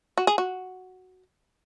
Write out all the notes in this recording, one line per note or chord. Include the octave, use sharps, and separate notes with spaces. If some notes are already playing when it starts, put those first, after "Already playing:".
F#4
G#4
F#4